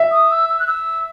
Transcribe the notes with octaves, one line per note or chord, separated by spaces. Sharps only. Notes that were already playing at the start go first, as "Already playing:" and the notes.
Already playing: E5
D#6
E6
E6
F#6
E6